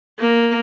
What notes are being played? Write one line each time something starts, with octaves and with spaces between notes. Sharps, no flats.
A#3